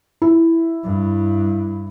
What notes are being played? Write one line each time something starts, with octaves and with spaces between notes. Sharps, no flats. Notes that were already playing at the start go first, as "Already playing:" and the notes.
E4
G2